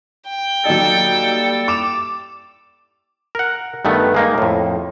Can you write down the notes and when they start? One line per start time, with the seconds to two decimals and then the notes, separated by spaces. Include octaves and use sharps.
0.28 G5
0.65 F#3 G3 A#3 D#4 A4
1.68 D6 E7 F7
3.35 A#4 F#5
3.85 G2 D#3 A3 B3
4.14 G#3 A#3 D#4
4.38 F2 A2